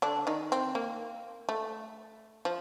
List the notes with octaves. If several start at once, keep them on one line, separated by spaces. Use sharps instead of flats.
D3 D4
D#3 D#4
C4
A#3
A3
F3